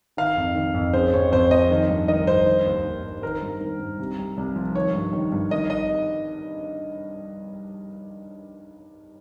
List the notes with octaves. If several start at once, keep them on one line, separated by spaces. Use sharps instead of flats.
D#3 F5
F2
D#3
F2
C#3 C5
F2 C#5
F2 C5
F3 D#5
D#3
G2
D#3 D#5
G2 C5
D#3
D#2
D#3
D#2
D#3 A#4
G2
D#3
G2
C3
C2
C2
F3
D#3 C#5
G2
D#3
G2
D#3 D#5
D#5